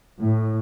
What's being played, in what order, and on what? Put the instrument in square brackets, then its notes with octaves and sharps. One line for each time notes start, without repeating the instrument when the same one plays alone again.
[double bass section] A2